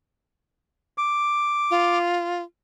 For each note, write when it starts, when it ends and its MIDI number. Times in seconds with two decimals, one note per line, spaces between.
0.98 1.98 86
1.71 2.42 65